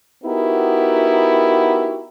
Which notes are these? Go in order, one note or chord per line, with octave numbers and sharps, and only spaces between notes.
B3 D#4 E4 F#4 G4 A#4